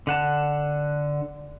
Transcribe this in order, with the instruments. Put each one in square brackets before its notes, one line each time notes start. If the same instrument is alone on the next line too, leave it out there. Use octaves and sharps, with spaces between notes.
[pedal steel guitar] D3 F#5 A5